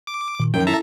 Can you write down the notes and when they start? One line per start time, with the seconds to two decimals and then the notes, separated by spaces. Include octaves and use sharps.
0.07 D6
0.40 A#2 D#3
0.54 F#2 D#3 F3 G5
0.67 E4 A4 E5 A5 A#5